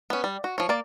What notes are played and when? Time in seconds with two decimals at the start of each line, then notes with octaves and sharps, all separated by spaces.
0.10 B3 C#4
0.24 G3
0.44 F#4
0.58 F3 C#5
0.69 A#3 D5